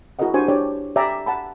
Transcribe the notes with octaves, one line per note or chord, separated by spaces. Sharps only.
E4 F#4 G#4 A#4 D#5 F#5
D4 F#4 G4 C5 G#5 C#6
D4 G4 C#5 D5
G4 D5 E5 G5 G#5 A#5
F#5 A5 B5